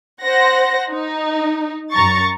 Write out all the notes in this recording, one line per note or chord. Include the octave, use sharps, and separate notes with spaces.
C5 F#5 A#6
D#4
F#2 A#5 C#6 A6